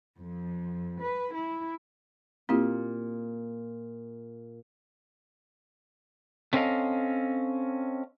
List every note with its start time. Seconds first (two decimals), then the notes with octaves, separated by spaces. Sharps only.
0.19 F2
1.05 B4
1.34 E4
2.49 A#2 C4 E4 F4 G4
6.53 A3 C4 C#4 A4 D#5 F5